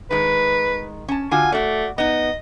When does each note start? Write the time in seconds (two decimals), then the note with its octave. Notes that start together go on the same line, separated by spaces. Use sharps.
0.11 D#3 G#3 B4
1.08 C#4 A5
1.31 D3 F4 F#4 G#5
1.52 A3 F#4 D5
1.98 B3 D#4 D#5